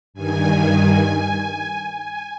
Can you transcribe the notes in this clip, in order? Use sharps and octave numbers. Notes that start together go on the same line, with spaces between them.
G2 D#3 G#5
G#5